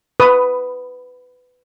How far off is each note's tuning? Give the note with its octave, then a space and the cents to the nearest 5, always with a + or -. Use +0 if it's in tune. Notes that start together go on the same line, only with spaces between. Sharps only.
B4 +15 D#6 +0